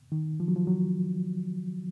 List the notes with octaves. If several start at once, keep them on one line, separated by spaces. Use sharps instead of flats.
D#3
F3
F#3
F3
F#3